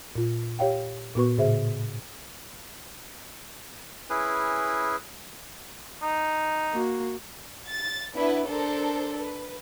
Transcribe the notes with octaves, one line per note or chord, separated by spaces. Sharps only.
A#2 F4
G4 C#5 F5 G5
A#2 B3 F#4 B4 C#6
A2 C#3 G#4 C5 E5
C#4 E4 G#4 B4
D#4
A#3 F#4
A6
B3 D4 E4 B4
D4 A4 A#4 C5
B4